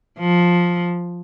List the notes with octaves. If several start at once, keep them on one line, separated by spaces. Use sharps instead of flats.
F3